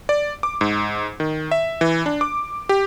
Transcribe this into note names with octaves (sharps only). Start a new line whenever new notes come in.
D5
D6
G#2
D#3
E5
E3
D4
D6
G4